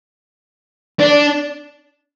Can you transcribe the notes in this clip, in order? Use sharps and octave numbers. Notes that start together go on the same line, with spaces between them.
D4